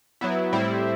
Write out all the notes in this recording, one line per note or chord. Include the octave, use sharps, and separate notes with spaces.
F#3 B3 E4
A2 G3 C4 E4